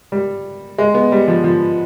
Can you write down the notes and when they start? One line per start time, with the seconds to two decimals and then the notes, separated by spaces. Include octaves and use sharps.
0.12 G3
0.78 G#3
0.94 B3
1.12 G3
1.28 F3
1.44 F3